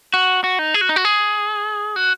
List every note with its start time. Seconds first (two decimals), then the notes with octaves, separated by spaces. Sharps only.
0.14 F#4
0.44 F#4
0.59 D#4
0.74 G#4
0.81 F#4
0.89 D#4
0.96 F#4
1.05 G#4
1.96 F#4